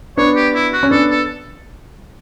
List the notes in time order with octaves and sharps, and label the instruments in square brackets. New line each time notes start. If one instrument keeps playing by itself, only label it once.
[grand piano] B3 D4 [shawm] C#5
[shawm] G4
E4
F#4
[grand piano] C#4
[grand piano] B3 D4 [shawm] A4
[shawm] A4